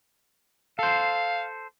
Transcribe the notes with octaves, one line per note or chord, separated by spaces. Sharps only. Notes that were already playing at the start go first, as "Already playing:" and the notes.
A4 C5 F5